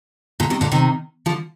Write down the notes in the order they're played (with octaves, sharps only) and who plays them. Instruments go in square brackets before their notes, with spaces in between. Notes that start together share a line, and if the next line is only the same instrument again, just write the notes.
[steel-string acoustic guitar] A#2 D3
C3 D#3
A#2 D3
C3 D#3
D3 F3